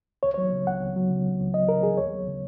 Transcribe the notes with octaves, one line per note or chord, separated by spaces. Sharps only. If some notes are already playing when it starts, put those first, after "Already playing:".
C#2 C#5
C#5
F#3
C#3
C#2 F#5
C#2
F#3
C#3
C#2
C#2
F#3 D#5
C#3 A#4
C#2 G#4
D#2 C#5
F#3
C#3